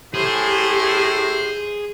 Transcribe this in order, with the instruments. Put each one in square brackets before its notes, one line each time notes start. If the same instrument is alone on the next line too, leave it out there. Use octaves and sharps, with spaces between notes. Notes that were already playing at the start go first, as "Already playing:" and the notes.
[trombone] A2 [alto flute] G4 [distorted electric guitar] G#4 [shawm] C5